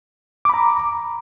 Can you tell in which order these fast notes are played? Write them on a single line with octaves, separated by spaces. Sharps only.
D6 B5 A#5